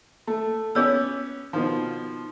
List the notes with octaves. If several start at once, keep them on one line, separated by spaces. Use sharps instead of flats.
A3
B3 C#4 G#4 C#5 E6
B2 D#3 F3